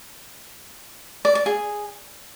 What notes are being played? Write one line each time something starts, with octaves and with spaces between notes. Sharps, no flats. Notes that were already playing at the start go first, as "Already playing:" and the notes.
D5
D5
G#4